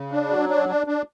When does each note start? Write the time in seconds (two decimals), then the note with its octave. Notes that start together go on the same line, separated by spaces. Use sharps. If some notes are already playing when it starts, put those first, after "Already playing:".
Already playing: C#3
0.12 D4
0.30 F#3
0.49 D4
0.69 D4
0.87 D4